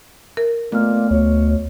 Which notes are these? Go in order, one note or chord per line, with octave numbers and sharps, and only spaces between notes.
A#4
A#2 A3 B3 F6
D2 C#5